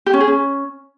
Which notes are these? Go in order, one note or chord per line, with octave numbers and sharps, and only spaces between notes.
G4
C#4
G#4
C#4